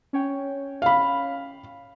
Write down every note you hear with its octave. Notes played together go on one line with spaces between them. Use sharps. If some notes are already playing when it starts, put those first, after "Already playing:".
C#4 C#5 G5
F5 B5